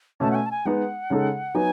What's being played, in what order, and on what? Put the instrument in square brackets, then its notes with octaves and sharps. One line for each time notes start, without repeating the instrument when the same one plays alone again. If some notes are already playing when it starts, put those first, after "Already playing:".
[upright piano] B2 A3 C#4 [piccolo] A5
[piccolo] F#5
G#5
A5
G#5
[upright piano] G#3 B3 D#4 [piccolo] F#5
[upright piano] C#3 G#3 D#4 A4
[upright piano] F#3 B3 D#4 [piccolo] G#5